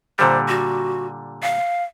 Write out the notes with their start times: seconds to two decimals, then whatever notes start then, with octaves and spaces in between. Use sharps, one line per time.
0.19 A#2 D3 G3 C5
0.48 F#4
1.43 F5